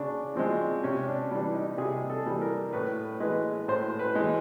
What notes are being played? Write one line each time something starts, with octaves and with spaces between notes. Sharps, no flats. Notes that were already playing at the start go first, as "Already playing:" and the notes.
Already playing: C#3 D4
F3 G#3 C4
C3 C#4
D4
E3 G3 D4
D#4
C3 G#4
A4
E3 G3
A#4
A2 B4
E3 G#3 B4
A2 C5
B4
E3 G#3